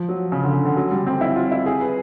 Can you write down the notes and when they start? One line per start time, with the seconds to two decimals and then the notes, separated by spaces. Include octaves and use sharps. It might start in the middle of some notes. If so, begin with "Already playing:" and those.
Already playing: F3
0.09 F#3
0.32 C#3
0.43 D3
0.54 C#3
0.65 D3
0.76 F#3
0.91 G3
1.07 C4
1.21 E4
1.36 F4
1.51 E4
1.66 G#4
1.81 B4